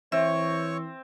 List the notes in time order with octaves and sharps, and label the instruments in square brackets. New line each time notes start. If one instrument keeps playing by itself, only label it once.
[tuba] E3 [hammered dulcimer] C4 [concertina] C#5 C#6 [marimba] E5